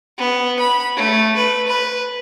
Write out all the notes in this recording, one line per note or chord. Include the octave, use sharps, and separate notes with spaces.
B3
B5
A3
B4
B4